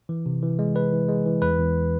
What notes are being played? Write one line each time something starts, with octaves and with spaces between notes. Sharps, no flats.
E3
C3
E3
G#3
G#3 B4
E3
G#3
E3
E2 B4
E2